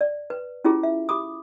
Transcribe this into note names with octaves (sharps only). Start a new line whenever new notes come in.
D5
B4
C#4 E4 F4 G4 G#4
E5
G4 B5 D6 D#6